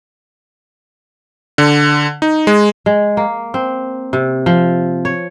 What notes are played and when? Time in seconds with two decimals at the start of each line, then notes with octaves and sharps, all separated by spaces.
1.58 D3
2.22 D#4
2.47 G#3
2.86 G#3
3.17 A#3
3.54 C4
4.13 C3
4.46 F3
5.05 C#5